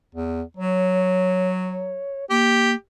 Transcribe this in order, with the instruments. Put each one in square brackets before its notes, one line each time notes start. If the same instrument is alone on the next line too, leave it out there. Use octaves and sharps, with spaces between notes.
[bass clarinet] E2
[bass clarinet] F#3 [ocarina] C#5
[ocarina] A#3 [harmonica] G4